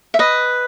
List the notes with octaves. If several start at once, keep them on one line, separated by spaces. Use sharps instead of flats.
E5
B4 D#5